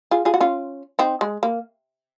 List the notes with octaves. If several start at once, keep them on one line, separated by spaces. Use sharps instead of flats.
F4 G#4
F4 G#4
F#4
C#4 F4
C4 D#4
G#3
A#3